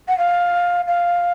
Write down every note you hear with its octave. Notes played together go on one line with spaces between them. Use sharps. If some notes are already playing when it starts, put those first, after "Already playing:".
F#5
F5
F5